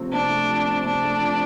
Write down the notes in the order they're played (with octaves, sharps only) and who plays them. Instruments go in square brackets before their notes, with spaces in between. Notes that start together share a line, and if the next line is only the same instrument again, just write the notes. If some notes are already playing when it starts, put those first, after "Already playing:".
Already playing: [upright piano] C3 F3 A3 C4
[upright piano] C3 [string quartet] D4
[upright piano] A3
F3
C4
[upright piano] C3 [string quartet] D4
[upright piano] A3
F3